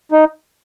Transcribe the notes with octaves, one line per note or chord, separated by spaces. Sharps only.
D#4